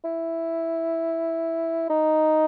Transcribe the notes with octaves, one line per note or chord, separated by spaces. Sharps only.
E4
D#4